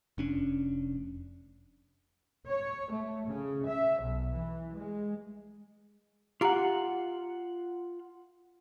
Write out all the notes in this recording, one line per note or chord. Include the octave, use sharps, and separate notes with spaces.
F1 C#4 D4
C#5
A3
C#3
E5
B1
E3
G#3
F4 G4 F#5 A#5